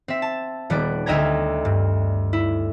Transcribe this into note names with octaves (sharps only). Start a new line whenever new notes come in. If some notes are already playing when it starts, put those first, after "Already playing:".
C4 E5
A5
D#1 G3 B3 D5 D7
D2 D#5 E5 G5 A#5 G#6
G2
E4